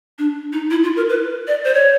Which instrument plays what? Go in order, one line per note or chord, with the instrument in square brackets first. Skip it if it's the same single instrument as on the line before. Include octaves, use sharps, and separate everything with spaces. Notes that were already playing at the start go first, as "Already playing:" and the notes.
[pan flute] D4
D#4
E4
F4
A#4
B4
D5
C5
C#5